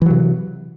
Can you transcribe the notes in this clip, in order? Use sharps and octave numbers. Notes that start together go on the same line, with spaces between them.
C3 E3 F#3